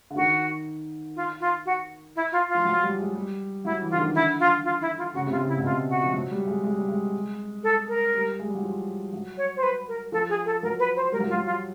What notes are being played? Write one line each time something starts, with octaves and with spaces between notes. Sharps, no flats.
D3
D#3 F#4
F4
F4
F#4
E4
F4
F4
F3
F#3
G3
G#3
G3
F#3 E4
E3
F4
D3
D#3
D3 E4
F4
F4
E4
F4
C#3 F#4
C3 F4
C#3
E4
B2
C3 F4
F#4
F3
F#3
G3
G#3
G#3
G3
G#3
A4
A#4
G3
G#3
G3
F#3
F3
F#3
C#5
C5
B4
A#4
F3 A4
G#4
A4
F#3 A#4
B4
C5
G3 A#4
F#3
F3 F4
F#3
F4